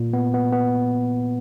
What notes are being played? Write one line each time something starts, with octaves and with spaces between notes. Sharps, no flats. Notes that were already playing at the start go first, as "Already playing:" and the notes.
Already playing: A#2
B3
B3
B3